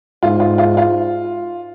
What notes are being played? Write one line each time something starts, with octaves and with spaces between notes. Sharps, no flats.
G#2 F4
F4
F4
F4